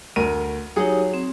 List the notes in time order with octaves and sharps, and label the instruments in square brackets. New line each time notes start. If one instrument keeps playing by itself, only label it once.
[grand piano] D2 A#4 D#7
[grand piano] F#3 G#4 [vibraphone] D#4 G4 C#5
[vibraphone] C4